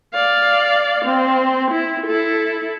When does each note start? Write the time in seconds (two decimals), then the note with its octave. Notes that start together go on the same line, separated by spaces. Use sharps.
0.13 D5 F5
1.05 C4
1.71 E4
2.06 E4 A4